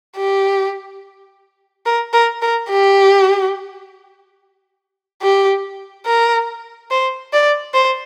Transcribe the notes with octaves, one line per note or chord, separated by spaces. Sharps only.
G4
A#4
A#4
A#4
G4
G4
A#4
C5
D5
C5